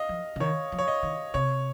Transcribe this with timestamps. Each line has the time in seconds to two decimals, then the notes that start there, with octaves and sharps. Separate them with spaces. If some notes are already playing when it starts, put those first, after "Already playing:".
Already playing: D#5 F5
0.09 F3
0.36 C#3
0.40 D#3 C#5
0.72 F3
0.79 C#5
0.88 D#5
1.03 D#3
1.34 C3 C#5